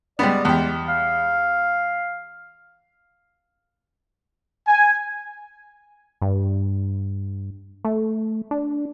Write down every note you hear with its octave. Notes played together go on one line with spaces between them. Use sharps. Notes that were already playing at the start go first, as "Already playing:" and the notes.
G3 G#3 B3 D5
E2 G#3 G4
F5
G#5
G2
A3
D4